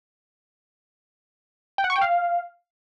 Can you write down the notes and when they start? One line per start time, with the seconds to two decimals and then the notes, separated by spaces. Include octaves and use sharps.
1.78 G5
1.84 F#5
1.90 C#6
1.96 G5
2.01 F5